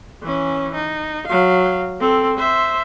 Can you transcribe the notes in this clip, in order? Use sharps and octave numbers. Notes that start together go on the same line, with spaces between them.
E3 C#4
D#4
F#3 F5
C4 A4
C5 E5